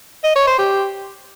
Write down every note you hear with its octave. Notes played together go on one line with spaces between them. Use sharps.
D#5
C#5
C5
G4